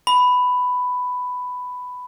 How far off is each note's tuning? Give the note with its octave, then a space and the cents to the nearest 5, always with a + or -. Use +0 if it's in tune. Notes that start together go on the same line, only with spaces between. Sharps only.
B5 +10